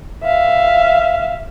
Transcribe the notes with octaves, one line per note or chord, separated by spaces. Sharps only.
E5 F5